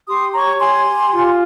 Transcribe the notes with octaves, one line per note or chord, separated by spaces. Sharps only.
G4 C6 D#6
C#5 A#5 C#6
G4 G#5 C6
G4
F4